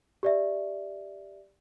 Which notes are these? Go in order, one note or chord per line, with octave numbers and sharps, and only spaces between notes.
G4 D5 E5